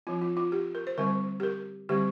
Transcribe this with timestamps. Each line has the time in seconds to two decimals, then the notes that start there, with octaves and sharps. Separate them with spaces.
0.07 F3 C4 F4
0.22 F4
0.37 F4
0.52 G4
0.75 A#4
0.87 C5
0.98 D3 G3 C4 A#4
1.40 G4
1.43 A#4
1.89 D3 G3 C4 G4